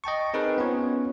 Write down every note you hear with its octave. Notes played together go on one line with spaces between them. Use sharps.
D#5 G5 A5 C#6
C4 D#4 G#4 A#4 B4
B3 C#4 F4 C#5